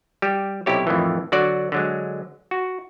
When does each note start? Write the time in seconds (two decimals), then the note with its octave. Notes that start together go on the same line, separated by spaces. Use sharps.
0.22 G3 G4
0.66 B1 C3 E4 G4 A4 C#5
0.87 F2 A2 D#3 E3
1.32 D3 F#3 F#4 D5
1.72 D3 F#3 G#3
2.51 F#4